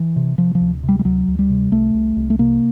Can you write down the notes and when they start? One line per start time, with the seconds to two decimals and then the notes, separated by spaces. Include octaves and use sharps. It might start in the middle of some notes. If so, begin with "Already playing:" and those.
Already playing: E3
0.16 C3
0.38 C3 F3
0.55 F3
0.61 D2
0.83 C3
0.89 G3
0.99 G3
1.05 D2 F#3
1.28 D2
1.39 G3
1.50 C3
1.72 C2 A3
1.94 C2
2.16 C2
2.30 A3
2.39 C3 A#3